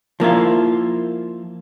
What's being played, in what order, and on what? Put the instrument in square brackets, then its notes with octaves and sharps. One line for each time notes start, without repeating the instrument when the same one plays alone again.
[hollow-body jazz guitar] F3 A#3 E4 F4